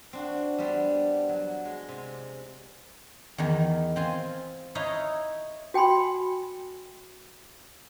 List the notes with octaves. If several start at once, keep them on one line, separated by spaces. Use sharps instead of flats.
C4 D4 F#4
G3 B3 C4 D4
F#3
G#3
C3
E2 D#3
C4 F4 G#5
D#4 E4 C#5 D#5 F5
F#4 G5 G#5 B5 C6